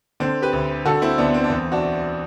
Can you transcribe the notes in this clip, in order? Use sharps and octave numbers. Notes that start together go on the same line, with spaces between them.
D3 C4
G4 B4
D2
D3 F#4 A4
C4 E4
D2 B3 D4
C4
D4
E2 C4
D4 F#4